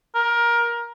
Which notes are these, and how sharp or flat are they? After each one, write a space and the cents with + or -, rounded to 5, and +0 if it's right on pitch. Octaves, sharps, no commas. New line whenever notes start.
A#4 +20